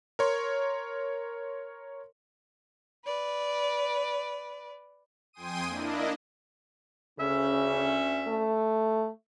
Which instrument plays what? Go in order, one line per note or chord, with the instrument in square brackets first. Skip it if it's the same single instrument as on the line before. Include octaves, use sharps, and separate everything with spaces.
[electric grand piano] A#4 C#5 C6
[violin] B4 D5
[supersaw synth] F2 G5 G#5 C6 D#6 D#7
A#3 D4 E4 D#5
[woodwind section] D2 C#4 E5 [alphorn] C#3
[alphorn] A3